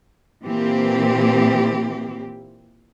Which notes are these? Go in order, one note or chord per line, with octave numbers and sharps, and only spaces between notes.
A#2 E3 A#3 C4 G4